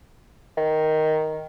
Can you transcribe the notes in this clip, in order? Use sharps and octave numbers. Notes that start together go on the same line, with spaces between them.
D#3